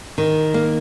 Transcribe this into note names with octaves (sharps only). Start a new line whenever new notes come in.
D#3
A#3